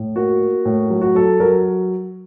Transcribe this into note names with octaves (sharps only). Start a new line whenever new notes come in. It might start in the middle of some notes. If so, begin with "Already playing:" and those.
Already playing: A2
A#3 F#4
A#3
A2
F#3
F#4
F#3 A4
F#3 A#4